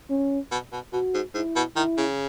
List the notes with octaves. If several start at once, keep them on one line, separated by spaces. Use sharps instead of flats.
C#4
B2
B2
B2 F#4
G#2
G#2 E4
B2
D#3 E4
C#3